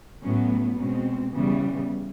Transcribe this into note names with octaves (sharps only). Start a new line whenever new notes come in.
A2 F#3 B3 C#4
B2 G#3 C4 C#4
C#3 E3 G3 B3